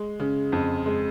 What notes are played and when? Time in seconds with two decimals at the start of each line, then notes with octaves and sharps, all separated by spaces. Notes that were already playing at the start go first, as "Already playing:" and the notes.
Already playing: G#3
0.20 C#3
0.52 F2
0.86 G#3